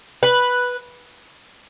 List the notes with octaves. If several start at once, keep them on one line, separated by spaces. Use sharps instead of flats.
B4